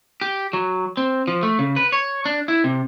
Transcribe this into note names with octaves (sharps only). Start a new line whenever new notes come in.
G4
F#3
C4
F3
A3
C#3
B4
C#5
D4
E4
C3